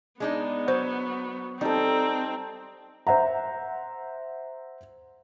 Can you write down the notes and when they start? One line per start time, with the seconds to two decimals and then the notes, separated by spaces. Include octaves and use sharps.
0.20 G#3 B3 D4 D#4
0.68 F#3 C5
1.61 G3 C4 D#4 A4
3.07 C5 E5 F#5 A#5